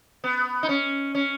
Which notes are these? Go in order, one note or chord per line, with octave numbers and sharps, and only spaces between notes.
B3
D#4
C#4
C#4